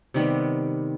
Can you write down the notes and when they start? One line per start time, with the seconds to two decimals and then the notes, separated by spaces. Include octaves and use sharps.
0.14 C3 D#3 G3 B3